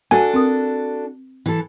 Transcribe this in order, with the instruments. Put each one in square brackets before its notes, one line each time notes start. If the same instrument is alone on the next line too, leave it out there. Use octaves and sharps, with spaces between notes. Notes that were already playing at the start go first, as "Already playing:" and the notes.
[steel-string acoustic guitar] D4 F#4 A4 [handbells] G#5
[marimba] C4 A#4 D#6
[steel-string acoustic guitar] E3 A4